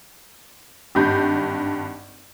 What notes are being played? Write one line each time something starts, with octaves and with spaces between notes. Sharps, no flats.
G#1 G2 G6